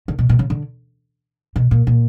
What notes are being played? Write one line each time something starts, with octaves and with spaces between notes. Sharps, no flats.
D3
B2
B2
C#3
D3
B2
A#2
A#2